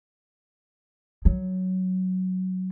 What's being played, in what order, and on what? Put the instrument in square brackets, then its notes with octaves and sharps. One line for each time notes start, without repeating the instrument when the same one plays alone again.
[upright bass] F#3